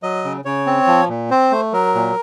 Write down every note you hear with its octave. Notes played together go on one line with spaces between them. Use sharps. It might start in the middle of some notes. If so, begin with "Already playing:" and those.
F#3 D#5
C#3
C#3 C#5
C4
F3
A#2
C4 C5
A3
F#3 A#4
A#2